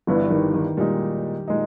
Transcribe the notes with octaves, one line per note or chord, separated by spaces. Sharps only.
G1 G2 E3 G3 B3 E4
D#3
D#3
A#2 G3 G#3 D#4
A#2 G#3 D#4